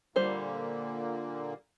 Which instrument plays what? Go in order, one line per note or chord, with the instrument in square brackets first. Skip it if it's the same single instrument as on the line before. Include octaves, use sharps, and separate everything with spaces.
[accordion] A#2 D3 A#3 [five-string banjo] G3 C5